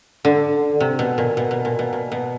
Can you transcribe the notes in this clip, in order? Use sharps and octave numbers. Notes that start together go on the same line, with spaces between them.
D3
C3
B2
A#2
B2
B2
A#2
B2
A#2
B2